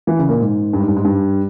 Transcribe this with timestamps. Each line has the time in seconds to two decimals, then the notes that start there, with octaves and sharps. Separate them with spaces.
0.07 E3
0.19 C#3
0.29 A#2
0.40 G#2
0.73 G2
0.80 G#2
0.88 G2
0.96 G#2
1.05 G2